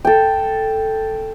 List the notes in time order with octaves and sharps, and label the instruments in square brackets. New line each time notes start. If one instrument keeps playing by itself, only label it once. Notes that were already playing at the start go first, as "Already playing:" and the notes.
[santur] A4 G5